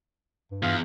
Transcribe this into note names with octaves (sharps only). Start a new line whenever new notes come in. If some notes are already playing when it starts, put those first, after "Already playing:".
G2
E2 G2 F4 F5 D#6